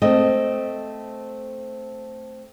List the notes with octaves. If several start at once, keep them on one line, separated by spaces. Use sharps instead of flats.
A3 C4 D#5